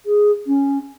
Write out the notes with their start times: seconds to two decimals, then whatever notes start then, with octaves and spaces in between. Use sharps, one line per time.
0.06 G#4
0.47 C#4